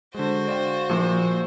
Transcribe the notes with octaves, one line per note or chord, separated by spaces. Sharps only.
D3 G#3 F#4 C5
D5 F5 G5
A#2 F3 A#3